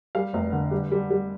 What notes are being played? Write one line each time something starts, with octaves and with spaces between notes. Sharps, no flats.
G3 F5
F1
D3
G3
G3
G3